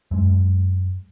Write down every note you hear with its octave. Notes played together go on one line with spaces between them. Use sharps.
F#2 G#3